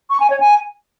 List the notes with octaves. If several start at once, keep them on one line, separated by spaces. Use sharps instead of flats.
C#6
G#5
C#5
G#5